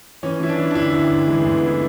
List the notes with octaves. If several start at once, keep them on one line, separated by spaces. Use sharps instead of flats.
E3 C#4
E3 E4
D4
E3
D4
D2 E4
D2
D2
E3 G#3
A3
D2
B3
D2 E4